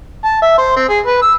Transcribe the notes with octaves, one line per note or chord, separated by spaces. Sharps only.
A5
E5
C5
C4
G#4
B4
E6